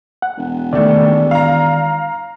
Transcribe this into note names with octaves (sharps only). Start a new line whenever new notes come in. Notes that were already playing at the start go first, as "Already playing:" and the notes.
F#5
E1
D#2 D#3 A3 D5
F5 A#5